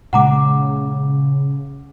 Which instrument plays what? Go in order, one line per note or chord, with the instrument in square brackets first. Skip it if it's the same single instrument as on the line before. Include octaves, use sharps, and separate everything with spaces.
[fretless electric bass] A#2 G#3 [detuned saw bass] C#3 [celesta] F#5 A#5 D6